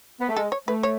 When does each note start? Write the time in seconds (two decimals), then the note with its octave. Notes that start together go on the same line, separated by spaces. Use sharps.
0.20 B3
0.28 A3
0.37 G#3 A4
0.52 C#5
0.68 A3 B4
0.83 C#5